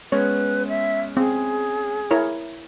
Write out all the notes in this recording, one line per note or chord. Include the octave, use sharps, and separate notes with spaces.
G#3 B3 C#4 B4 C#5
E5
C4 G#4
E4 A#4 C#5